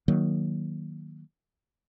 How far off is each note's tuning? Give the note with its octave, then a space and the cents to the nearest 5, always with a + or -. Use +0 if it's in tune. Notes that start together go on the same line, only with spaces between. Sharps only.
D#3 +0 F#3 +0 A#3 +10